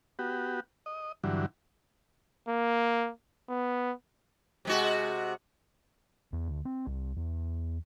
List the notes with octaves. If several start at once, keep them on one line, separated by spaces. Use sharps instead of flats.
B3 F#4 G4
D#5
G2 D3 E3 F#3
A#3
B3
C3 G#3 F#4
E2
D2
C4
C2
E2